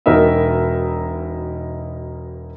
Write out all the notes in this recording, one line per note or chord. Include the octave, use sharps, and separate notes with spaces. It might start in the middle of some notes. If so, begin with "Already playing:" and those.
E1 B2 D#4 A#4 E5